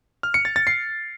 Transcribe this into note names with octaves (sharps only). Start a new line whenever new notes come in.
F6
C#7
A6
A6
C7